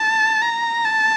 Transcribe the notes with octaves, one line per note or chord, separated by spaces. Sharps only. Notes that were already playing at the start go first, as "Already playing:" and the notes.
Already playing: A5
A#5
A5